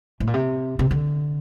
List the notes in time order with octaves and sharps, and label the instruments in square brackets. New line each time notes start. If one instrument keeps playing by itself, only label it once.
[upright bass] A2
A#2
C3
C3
D3